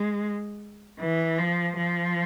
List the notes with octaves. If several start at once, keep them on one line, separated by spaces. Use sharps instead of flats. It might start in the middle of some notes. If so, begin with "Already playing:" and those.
Already playing: G#3
E3
F3
F3